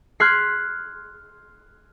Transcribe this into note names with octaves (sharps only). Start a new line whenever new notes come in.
C6 F6 F#6 G#6 B6 C7